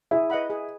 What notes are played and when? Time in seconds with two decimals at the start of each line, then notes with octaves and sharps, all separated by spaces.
0.11 E4 G#4
0.30 B4 D#5 F#5 B5
0.50 G#4